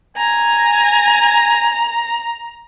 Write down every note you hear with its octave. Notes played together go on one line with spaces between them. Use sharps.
G#5 A#5